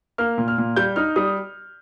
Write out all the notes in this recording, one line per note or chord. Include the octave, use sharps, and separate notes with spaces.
A#3 F6
A#2
F6
A#2
G3 G6
D#4 F6
G3 D#6